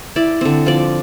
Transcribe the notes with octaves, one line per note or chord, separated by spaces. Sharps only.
E4 D5
D3 C4
F3 D5